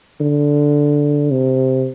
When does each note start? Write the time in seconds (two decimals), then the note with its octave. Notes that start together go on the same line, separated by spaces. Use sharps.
0.21 D3
1.32 C3